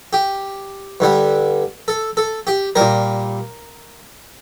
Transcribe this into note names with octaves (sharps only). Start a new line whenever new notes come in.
G4
G2 D3 G3
A4
A4
G4
A#2 G3 A#4